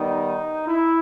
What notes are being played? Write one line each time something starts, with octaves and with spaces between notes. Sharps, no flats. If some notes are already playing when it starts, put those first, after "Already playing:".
Already playing: D#3 G3 B3 D#4
E4